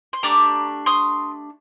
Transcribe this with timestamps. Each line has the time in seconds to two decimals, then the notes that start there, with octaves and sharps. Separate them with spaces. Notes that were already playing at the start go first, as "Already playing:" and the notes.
0.13 C6
0.23 A3 D4 G4 A#5 D6
0.86 C6 D#6